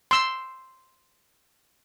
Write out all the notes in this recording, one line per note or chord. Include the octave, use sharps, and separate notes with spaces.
C6 E6